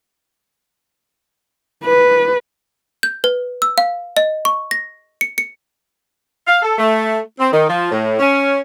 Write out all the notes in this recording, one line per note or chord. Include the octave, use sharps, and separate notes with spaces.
B4
G6
B4
E6
F5
D#5
C#6
A#6
C#7
C#7
F5
A4
A3
C4
D#3
F3
A2
C#4